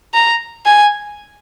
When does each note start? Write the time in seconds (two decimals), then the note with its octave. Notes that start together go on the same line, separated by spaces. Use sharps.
0.14 A#5
0.66 G#5